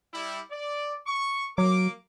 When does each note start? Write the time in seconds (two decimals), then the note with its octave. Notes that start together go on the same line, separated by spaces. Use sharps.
0.14 G3 E4
0.51 D5
1.07 C#6
1.58 F#3 A#3 A#4 D6